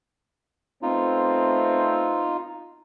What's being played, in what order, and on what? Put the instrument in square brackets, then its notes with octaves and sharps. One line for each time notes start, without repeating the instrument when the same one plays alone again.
[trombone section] A3 B3 C4 [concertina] D#4 F4